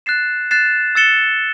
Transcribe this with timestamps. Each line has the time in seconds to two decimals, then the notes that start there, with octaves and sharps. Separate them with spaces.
0.06 F#6 A6 C7 E7
0.51 F#6 A6 C7 E7
0.95 E6 A6 C#7 E7 G7